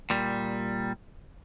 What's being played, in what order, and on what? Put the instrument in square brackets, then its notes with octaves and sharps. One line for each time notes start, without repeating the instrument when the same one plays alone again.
[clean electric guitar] A#2 G3